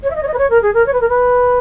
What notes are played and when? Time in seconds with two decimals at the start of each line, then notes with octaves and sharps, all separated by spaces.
0.03 C#5
0.10 E5
0.15 D#5
0.22 C#5
0.27 D#5
0.33 B4
0.38 C#5
0.50 A#4
0.62 G#4
0.74 A#4
0.86 C#5
0.93 B4
1.00 A#4
1.09 B4